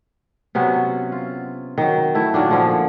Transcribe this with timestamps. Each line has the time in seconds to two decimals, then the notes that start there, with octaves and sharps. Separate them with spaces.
0.55 C3 F#3 B3 C#4
1.12 F4
1.78 D#3 F#3
2.15 A3 E4
2.34 A#2 D#3 F#3 D4
2.51 D3 F3 C#4